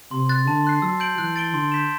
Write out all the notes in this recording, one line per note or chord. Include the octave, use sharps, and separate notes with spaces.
C3 C6
F#6 A6
D3 A5
C6 F#6 C7
F#3 E6
G6 D7 F#7
E3 F#6
A6 D7 G7
D3 C6
G6 B6 E7